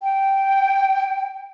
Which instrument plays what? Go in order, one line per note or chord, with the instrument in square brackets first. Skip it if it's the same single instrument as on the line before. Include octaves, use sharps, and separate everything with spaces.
[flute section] G5